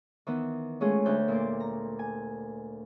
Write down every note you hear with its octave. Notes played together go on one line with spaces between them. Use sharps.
D#3 E3 B3
G#3 A3 C#4 F4 G#4
D2 F#6 G6
A#2 C6 D6
A#5
G#5